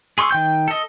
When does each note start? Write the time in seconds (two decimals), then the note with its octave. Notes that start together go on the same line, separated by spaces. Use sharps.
0.18 G#4 C6 C#6 E6
0.31 D#3 G5 G6
0.68 A4 D#5